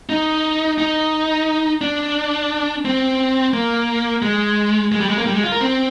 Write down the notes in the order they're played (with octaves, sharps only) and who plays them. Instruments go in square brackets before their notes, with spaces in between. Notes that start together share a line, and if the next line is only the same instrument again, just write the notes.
[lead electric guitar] D#4
D#4
D4
C4
A#3
G#3
G#3
G3
G#3
A#3
G3
G#3
F4
A#4
C4